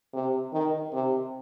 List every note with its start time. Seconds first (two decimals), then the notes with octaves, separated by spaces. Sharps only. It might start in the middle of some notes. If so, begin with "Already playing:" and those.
0.14 C3
0.53 D#3
0.93 C3